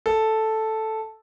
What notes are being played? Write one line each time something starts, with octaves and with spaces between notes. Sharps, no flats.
A4